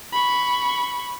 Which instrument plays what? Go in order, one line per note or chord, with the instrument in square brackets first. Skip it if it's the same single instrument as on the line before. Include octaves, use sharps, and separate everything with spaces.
[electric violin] B5 C#6